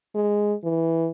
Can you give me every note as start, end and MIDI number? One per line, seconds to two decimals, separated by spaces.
0.15 0.54 56
0.64 1.09 52